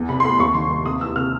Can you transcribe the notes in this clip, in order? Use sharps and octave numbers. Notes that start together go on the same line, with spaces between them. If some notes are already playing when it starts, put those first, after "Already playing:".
Already playing: E2
C3 B5
C6
A3 B5
D#2 C#6
D#3 C6
D#2
C3 D#6
E3 E6
C3 F6